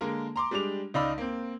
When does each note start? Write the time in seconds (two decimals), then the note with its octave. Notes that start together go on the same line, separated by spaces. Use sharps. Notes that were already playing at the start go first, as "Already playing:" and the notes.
0.01 D3 G#3 A#3 A#4
0.36 A#5 C6 D6
0.51 G3 G#3 D4 D6 F7
0.94 C#2 D#4 D5 F5 B5 E6
1.18 A#3 C4